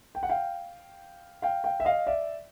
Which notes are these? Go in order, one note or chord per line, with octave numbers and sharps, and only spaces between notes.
G5
F#5
F5 G5
F5 G5
F5 G5
E5
D#5 F5
D5 E5